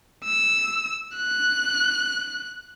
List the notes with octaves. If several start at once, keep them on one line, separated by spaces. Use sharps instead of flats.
E6
F#6